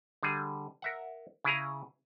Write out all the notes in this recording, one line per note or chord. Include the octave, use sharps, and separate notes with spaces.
D3 G3 G#4
A#4 E5 F#5
C#3 E4 G#4 A#5